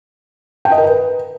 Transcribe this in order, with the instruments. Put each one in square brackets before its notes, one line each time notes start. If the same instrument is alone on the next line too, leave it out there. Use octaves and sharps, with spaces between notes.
[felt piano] G5
D#5
A#4
B4